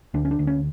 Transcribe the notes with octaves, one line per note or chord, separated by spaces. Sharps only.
D2 D4
C#4
D4
D2
C#4